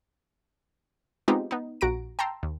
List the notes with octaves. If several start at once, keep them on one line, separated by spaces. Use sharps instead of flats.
G#3 B3 C4 D#4 F4 G4
B3 D#4
A#1 F#4 A#5 A#6 D7
G5 A5 A#5 C6 E6
D#2